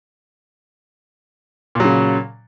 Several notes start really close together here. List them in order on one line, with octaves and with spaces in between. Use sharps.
A#2 F#3 C#3